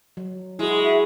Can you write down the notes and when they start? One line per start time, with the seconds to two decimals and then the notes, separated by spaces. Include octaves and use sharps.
0.17 F#3
0.59 G#3 E4 F#4 G#4
0.83 E5